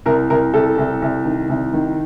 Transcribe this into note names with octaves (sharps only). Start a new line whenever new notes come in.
C2 A#4
C2 A#4
C2 A4
C2
C2
D#3
C2
D#3